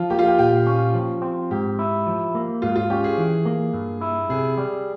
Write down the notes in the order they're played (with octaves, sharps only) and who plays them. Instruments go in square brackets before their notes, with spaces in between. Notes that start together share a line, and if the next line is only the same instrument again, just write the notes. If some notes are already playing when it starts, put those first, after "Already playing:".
Already playing: [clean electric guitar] F3 [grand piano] F4
[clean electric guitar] A#3 [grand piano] G4
[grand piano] F4
G4
[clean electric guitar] A#2 [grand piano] G4
[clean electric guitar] C#4
F3
C4
[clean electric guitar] G#2 [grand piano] G4
[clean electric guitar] E4
F3
A#3
[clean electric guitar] G#2 [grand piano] F4
[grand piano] F4
[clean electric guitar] C#4 [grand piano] G4
[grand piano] G#4
[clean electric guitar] E3
A#3
G2
E4
[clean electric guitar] C3 [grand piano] G#4
[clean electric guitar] G3